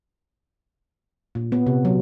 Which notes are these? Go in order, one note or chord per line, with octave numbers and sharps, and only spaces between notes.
A#2
B3
C3
F#3